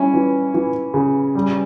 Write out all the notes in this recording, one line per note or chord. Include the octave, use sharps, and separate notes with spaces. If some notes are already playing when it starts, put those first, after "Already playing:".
Already playing: G3 C#4 E4
E3
E3
C#3
G3